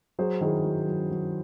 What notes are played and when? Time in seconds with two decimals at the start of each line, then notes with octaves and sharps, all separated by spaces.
0.19 F#3 G#4 C5
0.41 D#3 E4 G#4
0.64 F#3
0.87 F#3
1.11 F#3